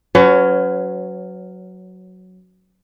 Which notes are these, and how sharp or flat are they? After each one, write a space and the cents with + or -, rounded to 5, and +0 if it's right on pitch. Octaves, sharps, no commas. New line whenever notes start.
F#3 +0 C#4 +15 B4 +35